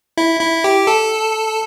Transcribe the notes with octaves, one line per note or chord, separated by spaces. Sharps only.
E4
E4
G4
A4